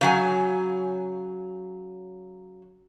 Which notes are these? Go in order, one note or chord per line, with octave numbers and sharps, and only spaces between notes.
C#3 F#3 G#5